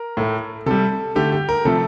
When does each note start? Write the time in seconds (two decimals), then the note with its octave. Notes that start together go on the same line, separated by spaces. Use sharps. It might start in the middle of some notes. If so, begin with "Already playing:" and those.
Already playing: A#4
0.17 A2 A3
0.66 C3 G3 A4
1.15 D3 A3 G4
1.32 G4
1.49 A#4
1.65 C3 F3 A3 A4